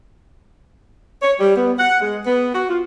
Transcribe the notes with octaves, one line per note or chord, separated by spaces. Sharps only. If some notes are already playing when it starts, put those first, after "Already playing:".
C#5
G3
B3
F#5
G#3
B3
F#4
F4